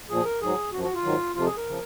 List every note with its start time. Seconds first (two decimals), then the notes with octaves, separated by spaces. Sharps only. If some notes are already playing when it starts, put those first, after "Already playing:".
0.09 A#2 F3 G#4
0.25 A#4
0.41 G#2 F#3 G#4
0.72 F#2 F3 F#4
0.84 F#4
0.94 F4
1.04 G#2 D#3 F#3
1.36 F2 C3 F3 F4
1.46 G#4
1.57 A#4
1.68 C#3 F3